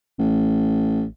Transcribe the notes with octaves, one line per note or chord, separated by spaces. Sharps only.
A1